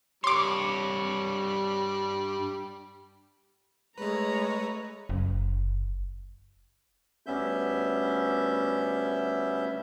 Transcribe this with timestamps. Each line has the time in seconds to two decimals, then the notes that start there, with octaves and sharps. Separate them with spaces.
0.24 G2 G3 C#5 C6 D6
3.98 G#3 A3 B4 C#5 A#5
5.09 F#1
7.26 D2 G3 B3 C#4 E5 G6